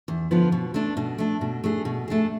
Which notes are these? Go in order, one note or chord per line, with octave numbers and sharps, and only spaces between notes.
E2
D3 F3 B3 F4
B2
A3 D4
B2
A3 D4
B2
A3 D4 G#4
B2
A3 D4 G#4